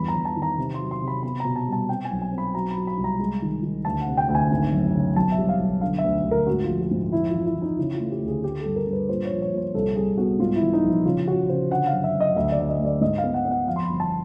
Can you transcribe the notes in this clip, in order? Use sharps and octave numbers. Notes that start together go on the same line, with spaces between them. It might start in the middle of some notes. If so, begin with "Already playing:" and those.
Already playing: E2 G2 B5
A#5
E2
A5
D#3
A#5
C3
C6
F#3
C6
C3
B5
B3 B5
B2 A#5
A5
G3 A5
C4 G5
G#5
B1
G#5
C4
B5
F#3 A#5
B5
F#3
B5
C2
A#5
G#3
D#3
D#3
D2 A5
F#5
C3
G5
D2
G#5
G#1
F#2
C#3
B1 A5
E5
G3
F5
B1
D3 F5
E5
D2
D2
A#4
G#2 F#4
A#1 F4
F#4
G#2
F2 E4
F4
E3
E4
E3
D#4
C#3 E4
F4
A3
G4
D2
G#4
A3 G4
A4
G2
A#4
G2
B4
A#2 C5
C#5
F3
C#5
A#2 C5
C2 A4
C2 G#4
B3 F#4
G#2 F4
E4
E3
D#4
A#1 E4
C#3 F4
C#3 F#4
C#3 C5
D3 F#5
F5
F#2
E5
F#2
D#5
D2 E5
D5
D2
D#5
A3
D5
G#2 D#5
F5
B3
F#5
B3
F#5
F2 F5
C6
B5
G1
A5